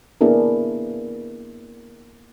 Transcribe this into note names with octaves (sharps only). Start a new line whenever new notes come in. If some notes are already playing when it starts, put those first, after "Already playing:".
A#3 B3 D4 E4 G#4 A#4